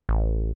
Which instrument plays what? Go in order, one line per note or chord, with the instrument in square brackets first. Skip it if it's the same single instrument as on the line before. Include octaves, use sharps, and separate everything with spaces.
[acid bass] A1